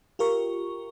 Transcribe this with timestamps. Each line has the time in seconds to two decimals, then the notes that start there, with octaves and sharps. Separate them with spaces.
0.19 F4 G4 A#4 C#6